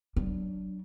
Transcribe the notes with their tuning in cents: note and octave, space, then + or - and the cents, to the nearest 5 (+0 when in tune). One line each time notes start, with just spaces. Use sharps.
F#3 +25 D4 +0